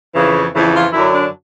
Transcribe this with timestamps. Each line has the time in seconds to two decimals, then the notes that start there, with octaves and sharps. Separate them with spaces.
0.14 F2 C#3 E3
0.54 F2 C#3 E3
0.74 F4
0.93 F#2 D3 F#3 E4
1.13 D4